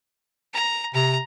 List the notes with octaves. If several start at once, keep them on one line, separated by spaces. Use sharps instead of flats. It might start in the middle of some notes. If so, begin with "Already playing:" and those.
A#5
C3 A#5